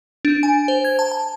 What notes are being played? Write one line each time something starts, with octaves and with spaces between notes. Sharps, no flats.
D4
G#5
C5
G#6
A5
A5